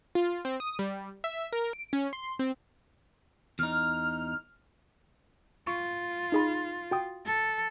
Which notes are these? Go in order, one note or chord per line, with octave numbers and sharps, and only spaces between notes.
F4
C4
D#6
G3
E5
A#4
D7
C#4
C6
C4
E2 D#4 F6
F4 C#6
D#4 G#4 B5
F#4 G5 D#6
A4